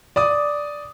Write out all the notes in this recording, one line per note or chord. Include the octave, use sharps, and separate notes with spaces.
D5 D6 D#6